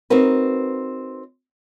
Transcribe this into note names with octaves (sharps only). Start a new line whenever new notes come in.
C4 D#4 F#4 A#4 B4